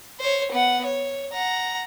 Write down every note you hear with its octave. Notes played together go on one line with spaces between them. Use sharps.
C5 C#5
B3 F#5
C#5
F#5 A#5